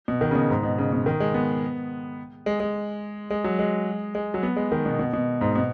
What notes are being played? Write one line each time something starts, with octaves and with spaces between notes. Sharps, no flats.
B2
D#3
C#3
B2
G#2
B2
C#3
B2
D#3
G#3
B3
G#3
G#3
G#3
F#3
G#3
G#3
F#3
B3
G#3
D#3
B2
B2
B2
G#2
B2